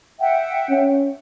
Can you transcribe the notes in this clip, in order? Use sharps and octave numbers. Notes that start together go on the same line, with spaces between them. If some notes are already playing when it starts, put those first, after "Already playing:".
E5 F#5 G5
C#4